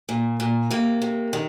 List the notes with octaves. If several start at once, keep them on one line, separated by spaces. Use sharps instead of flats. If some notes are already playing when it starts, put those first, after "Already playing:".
A#2
A#2
C3 A#3
C3
D#3